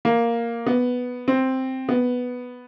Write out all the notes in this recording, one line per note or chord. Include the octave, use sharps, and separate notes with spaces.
A#3
B3
C4
B3